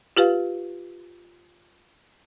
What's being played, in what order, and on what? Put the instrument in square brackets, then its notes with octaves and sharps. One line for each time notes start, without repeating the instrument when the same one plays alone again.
[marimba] F4 G4 B4 F5